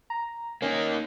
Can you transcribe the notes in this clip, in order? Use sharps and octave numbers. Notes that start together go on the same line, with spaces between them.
A#5
A#3 C#4 D#4